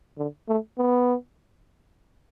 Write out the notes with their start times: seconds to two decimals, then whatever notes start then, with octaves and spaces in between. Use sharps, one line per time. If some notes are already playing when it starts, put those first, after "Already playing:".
0.18 D3
0.49 A3
0.78 B3